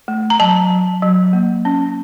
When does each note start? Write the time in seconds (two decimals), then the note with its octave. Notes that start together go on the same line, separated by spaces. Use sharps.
0.08 A3
0.30 A#5
0.40 F#3 A5
0.70 F#3
1.02 F#3
1.33 A#3
1.65 C#4